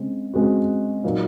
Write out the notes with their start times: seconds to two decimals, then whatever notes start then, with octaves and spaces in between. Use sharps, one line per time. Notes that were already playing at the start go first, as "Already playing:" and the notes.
Already playing: C#3 G#3 C4
0.34 C#3 G#3 C4 F#4
1.04 A#2 F#3 A#3 D#4